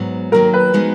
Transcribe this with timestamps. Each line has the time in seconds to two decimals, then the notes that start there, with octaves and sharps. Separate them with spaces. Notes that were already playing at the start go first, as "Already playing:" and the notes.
Already playing: G#2 F#3 B3
0.32 D#3 F#3 A#3 A#4
0.54 B4
0.73 F3 G#3 B3 D#4 F#4